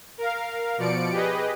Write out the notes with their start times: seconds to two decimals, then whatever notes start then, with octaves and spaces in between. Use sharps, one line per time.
0.18 A#4 F5
0.78 B2 F3 D5 C#7 D7
1.12 G4 G#4 B4 D#5